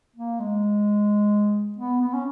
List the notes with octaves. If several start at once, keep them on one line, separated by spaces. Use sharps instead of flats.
A#3
G#3
B3
B3
C#4